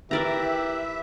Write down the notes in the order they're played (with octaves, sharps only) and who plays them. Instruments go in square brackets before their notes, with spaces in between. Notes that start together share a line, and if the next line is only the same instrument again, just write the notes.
[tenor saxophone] E3 [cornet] G4 [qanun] A#4 D5 A#5 [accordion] E5